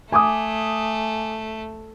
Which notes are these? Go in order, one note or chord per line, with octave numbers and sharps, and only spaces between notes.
A3 G#5 D6 D#6